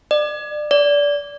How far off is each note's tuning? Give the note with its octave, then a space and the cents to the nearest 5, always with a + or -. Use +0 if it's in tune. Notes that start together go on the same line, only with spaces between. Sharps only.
D5 +30
D5 -20